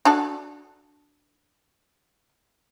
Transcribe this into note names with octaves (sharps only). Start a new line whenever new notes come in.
D4 F#4 A4